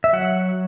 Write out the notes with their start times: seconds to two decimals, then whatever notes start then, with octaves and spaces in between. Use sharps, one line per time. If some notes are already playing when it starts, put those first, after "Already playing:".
0.04 E5
0.13 F#3 F#5